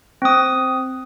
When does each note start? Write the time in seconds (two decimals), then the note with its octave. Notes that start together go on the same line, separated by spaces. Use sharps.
0.22 C4 D#6